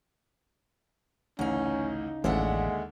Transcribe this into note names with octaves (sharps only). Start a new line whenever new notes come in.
A1 D2 C#3 C#4 D#4
A1 D#2 D3 G#3 D5 E5 F#5